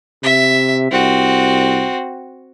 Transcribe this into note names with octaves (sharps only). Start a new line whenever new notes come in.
C3 E5
C2 C4 F#4